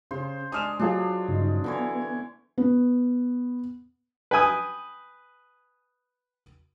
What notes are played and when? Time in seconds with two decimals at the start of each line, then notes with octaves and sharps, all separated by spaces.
0.11 C#3 C5
0.52 G#3 D4 D#6 F6 E7
0.79 F#3 D4 F4 G#4
1.28 G2 C#3 D#4
1.64 D3 E3 B3 C#5
2.58 B3
4.31 B4 G5 G#5 D#6